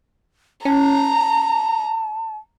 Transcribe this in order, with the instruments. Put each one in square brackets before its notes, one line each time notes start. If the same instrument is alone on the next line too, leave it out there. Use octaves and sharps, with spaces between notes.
[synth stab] C#4 [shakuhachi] A5 [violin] A#5